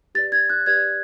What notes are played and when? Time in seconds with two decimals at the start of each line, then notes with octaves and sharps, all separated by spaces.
0.15 G4 B4 D5 A6
0.32 G#6
0.50 F#6
0.66 G4 B4 D5 G#6